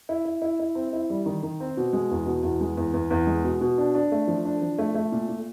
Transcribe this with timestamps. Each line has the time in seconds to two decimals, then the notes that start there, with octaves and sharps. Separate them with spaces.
0.09 E4
0.25 E4
0.42 E4
0.60 E4
0.75 C4
0.93 E4
1.10 G3
1.26 D#3
1.43 D#3
1.60 C4
1.77 B2
1.93 G#3
2.11 E2
2.26 B2
2.43 E2
2.61 G#3
2.77 E2
2.93 E2
3.10 E2
3.27 G#3
3.44 B2
3.61 B2
3.78 D4
3.94 D4
4.12 A3
4.28 F3
4.45 D4
4.62 F3
4.78 A3
4.95 A3
5.12 A#2
5.29 A#2